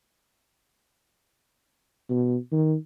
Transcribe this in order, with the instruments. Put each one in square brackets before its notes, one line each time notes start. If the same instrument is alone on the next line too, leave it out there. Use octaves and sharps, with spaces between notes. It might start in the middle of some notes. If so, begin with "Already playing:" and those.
[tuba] B2
D#3